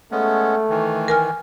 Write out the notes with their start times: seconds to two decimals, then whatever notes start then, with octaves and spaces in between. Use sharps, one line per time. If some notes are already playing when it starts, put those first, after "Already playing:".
0.12 G#3 A3 B3 C#4
0.69 D#3 E3
1.08 A#4 G#5 F6